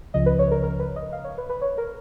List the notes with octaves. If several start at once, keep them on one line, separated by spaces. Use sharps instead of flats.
C#2 C#3 F3 D#5
B4
C#5
A#4
A#4
B4
D#5
F5
C#5
B4
B4
C#5
A#4